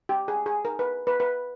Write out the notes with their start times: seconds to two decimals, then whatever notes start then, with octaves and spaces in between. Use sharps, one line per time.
0.09 G4
0.28 G#4
0.46 G#4
0.65 A#4
0.79 B4
1.07 B4
1.20 B4